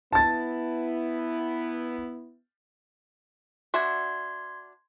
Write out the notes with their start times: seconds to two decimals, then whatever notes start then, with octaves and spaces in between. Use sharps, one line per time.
0.13 B3 E4 A5 A6
3.74 D4 F#4 E5 C6 G#6